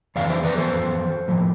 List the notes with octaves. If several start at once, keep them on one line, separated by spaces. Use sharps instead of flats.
F2 E3 D5 F5
C5 E5
B4 D5
A4 C5
A2 F3